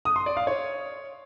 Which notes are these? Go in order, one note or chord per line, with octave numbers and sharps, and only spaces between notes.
D#6
C6
D5
F5
C#5